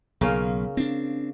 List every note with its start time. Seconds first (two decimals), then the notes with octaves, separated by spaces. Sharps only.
0.21 B1 C#3 A#3 C#4
0.77 C4 D4